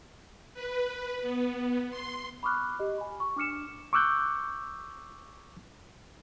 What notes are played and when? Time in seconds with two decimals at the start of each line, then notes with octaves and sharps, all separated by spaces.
0.54 B4
1.22 B3
1.91 C6
2.43 B5 C#6 D6 F6 F#6
2.79 G4 D#5
2.98 G#5 B5
3.20 C#6
3.36 D4 D6 F6 C#7 E7
3.93 C#6 D6 E6 F#6 G6